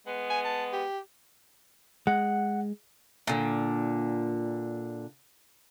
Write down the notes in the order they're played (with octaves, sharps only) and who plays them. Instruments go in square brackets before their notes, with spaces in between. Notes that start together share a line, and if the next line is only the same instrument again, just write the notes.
[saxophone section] G#3 B3
[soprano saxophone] G#5
A5
G4
[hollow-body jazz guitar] G#3 [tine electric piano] F#5
[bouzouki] A#2 D3